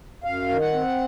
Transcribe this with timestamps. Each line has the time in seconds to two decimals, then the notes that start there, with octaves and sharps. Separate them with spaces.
0.24 F#2 F5
0.49 D#3
0.61 F#5
0.73 C4